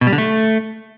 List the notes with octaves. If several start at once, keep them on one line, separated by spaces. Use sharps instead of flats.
B2
G3
D3
A3